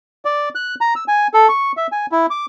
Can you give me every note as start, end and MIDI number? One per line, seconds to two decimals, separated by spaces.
0.25 0.49 74
0.55 0.75 90
0.81 0.94 82
0.96 1.04 88
1.08 1.27 80
1.34 1.48 69
1.49 1.72 85
1.77 1.87 76
1.92 2.06 80
2.12 2.26 64
2.30 2.46 86